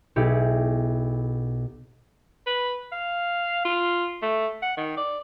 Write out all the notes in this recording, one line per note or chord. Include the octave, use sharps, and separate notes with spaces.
B1 E4 G4 G#4 C#7
B4
F5
F4
A3
F#5
D#3
D5